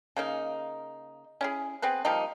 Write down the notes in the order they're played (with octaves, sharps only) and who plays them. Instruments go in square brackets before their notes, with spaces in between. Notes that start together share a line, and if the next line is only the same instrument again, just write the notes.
[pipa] C#3 A#3 D#4
C#4 E4 G#4
B3 C4 G#4 B4
F3 G3 A#3 D#4